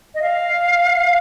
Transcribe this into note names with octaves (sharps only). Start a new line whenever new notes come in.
D#5
F5